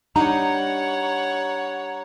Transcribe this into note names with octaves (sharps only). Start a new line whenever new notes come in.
G3 D4 D#4 C#5 F#5 A#5